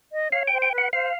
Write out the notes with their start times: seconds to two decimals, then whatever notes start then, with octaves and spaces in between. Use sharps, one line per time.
0.12 D#5
0.32 C#5 F5
0.48 C5 G5
0.62 G5
0.72 B4
0.78 F#5
0.93 C5 F5